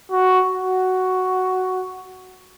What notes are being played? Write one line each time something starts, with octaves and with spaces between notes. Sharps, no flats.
F#4
F#4